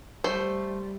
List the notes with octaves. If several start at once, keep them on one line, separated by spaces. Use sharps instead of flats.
G3 A3 C5